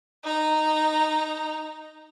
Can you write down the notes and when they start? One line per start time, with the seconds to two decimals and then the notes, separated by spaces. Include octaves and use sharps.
0.24 D#4 A#5